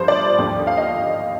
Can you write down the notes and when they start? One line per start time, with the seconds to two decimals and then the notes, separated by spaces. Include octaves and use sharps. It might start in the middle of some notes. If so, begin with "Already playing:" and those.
Already playing: G2 F3 C5
0.08 D5
0.38 D#2 D3 F3
0.67 F5
0.77 D#5